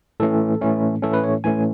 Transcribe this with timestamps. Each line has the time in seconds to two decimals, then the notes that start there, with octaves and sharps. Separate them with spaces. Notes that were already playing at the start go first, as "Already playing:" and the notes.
0.20 A2 E3 A3 C#4 A4
0.61 A2 E3 A3 C#4
1.03 A2 E3 A3 C#4 A4
1.13 B4
1.24 C#5
1.44 A2 E3 A3 C#4 G#5